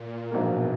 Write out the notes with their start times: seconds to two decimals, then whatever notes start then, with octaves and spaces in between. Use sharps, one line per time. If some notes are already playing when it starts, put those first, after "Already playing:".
Already playing: A#2
0.31 A#1 G#2 B2 F#3 A#3